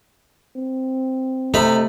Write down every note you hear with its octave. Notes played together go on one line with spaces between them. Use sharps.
C4
C3 A3 D#4 B5